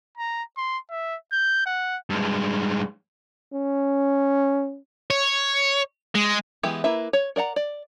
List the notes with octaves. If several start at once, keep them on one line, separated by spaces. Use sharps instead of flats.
A#5
C6
E5
G6
F#5
G2 G#3
C#4
C#5
G#3
E3 G#3 B3 E4 G4
A#3 E4 B4 E5
C#5
A#4 D5 F#5 A#5
D5